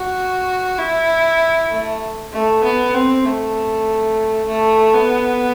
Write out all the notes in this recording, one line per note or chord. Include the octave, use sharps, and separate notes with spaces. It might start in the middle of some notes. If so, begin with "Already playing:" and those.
Already playing: F#4
E4
A3
A3
B3
C4
A3
A3
B3